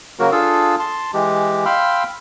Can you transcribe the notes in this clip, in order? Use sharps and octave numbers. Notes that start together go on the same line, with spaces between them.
C#3 F#3 A#3 F#4 A#4
D4 F4 G#4 A4 F5 E6
A5 C6
E3 G#3 G4
F5 G5 B5 C6 E6 F6